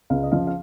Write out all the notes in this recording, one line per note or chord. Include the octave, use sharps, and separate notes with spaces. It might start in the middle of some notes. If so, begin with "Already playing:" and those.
C#2 F5
D#5
C#3 F3 F5
F5